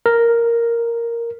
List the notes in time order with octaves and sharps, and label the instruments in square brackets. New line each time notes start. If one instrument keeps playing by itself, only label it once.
[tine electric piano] A#4